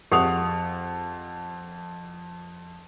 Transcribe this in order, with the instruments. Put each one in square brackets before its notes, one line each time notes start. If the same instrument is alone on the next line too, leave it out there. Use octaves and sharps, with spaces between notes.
[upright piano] F2 F#5 F7 [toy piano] G4 G#4 D#6